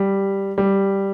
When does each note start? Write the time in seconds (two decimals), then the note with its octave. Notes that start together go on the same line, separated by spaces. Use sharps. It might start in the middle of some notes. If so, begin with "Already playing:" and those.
Already playing: G3
0.58 G3